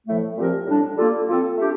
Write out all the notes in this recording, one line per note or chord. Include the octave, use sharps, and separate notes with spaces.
A2 F3 A3
A#2 F3 C4 G4 A#4
A2 G3 D4
G3 A#3 F4 A4
F3 C4 F4 A4
A3 D4 G4